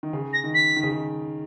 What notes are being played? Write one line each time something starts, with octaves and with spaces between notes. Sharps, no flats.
D#3
C#3
A#6
D#3
B6
D#3
C#3
D#3